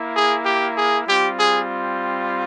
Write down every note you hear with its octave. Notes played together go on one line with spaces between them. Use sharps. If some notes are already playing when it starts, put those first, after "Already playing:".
Already playing: A#3 E4
G#4
G4
G#4
G3 C4 F4 G4
G#4